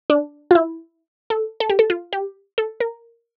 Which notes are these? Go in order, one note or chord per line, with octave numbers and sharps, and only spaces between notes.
D4
F4
E4
A4
A4
G4
A4
F4
G4
A4
A#4